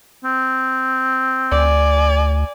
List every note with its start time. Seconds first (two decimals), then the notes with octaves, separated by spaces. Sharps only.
0.24 C4
1.52 D2 D5 G#5